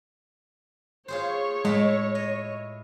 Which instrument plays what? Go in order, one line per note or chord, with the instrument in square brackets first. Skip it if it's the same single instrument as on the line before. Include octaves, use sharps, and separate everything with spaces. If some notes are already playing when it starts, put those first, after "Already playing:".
[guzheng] F4 G#4 C5 [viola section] C#5
[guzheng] A2 A3 [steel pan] G#3
[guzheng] D#5